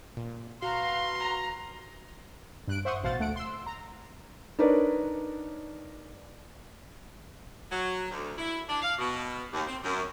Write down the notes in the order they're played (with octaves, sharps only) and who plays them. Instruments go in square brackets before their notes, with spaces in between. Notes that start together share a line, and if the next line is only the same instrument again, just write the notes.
[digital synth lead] A#2
[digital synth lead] F#4 [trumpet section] B4 C6 [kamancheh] F5 A#5
[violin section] A#5
[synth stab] G2 F#6 D7
C5 E5 F#5 C6 C#6 D#6
A1 B2 C5 F5 F#5 A6
D2 A3 F#5 D7
C6 E6
A#5
[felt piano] D4 D#4 A#4 B4 C#5 D5
[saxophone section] F#3
D2
E4
D4
F5
B2
D#2
C4
F#2